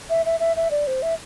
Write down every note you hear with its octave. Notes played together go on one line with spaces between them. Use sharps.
E5
E5
E5
E5
D5
C5
E5